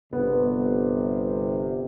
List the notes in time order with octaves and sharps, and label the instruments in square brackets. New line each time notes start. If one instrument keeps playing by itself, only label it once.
[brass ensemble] G1 C3 [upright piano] B3